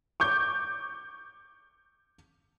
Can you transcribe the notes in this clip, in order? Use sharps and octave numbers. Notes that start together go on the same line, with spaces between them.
C#6 D6 G6